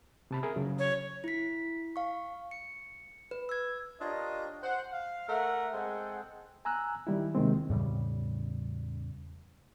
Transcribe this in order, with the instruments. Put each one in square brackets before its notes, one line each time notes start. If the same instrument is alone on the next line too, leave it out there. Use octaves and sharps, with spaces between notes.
[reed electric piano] C3 A5 B5
G#4 A#4 E5
C#3 F#3
[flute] C#5
[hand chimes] E4 B6
F5 C#6
C#7
B4
E6 G#6
[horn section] D4 F4 G4 A#4 C#5 D#5
C5 F#5
F5
A3 A#4 E5 F#5
G#3 C4 G#4 A4 F#5 G5
[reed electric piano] G#5 A#5 E6 F#6
D#3 G3 E4
D#2 C3 D#3 G#3 C4
[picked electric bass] E2 A2 C#3 G3